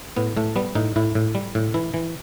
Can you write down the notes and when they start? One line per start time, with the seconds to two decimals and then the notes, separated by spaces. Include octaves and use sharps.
0.17 A2 B3
0.37 A2 A3
0.56 G3 B3
0.75 A2 D#4
0.96 A2 E4
1.15 A2
1.35 G3
1.55 A2
1.74 E3 E4
1.94 E3